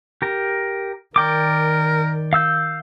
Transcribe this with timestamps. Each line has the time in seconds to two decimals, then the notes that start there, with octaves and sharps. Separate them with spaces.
0.22 G4 A#4
1.16 D#3 A#4 D5 G5 D6
2.33 F5 E6 G6